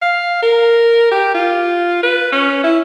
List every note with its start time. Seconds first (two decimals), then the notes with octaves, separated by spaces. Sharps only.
0.02 F5
0.42 A#4
1.11 G4
1.35 F4
2.03 B4
2.32 C#4
2.64 E4